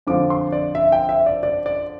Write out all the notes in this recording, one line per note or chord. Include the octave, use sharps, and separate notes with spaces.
F2 D3 F3 D6
C6
D5
E5
G5
E5
D5
D5
D5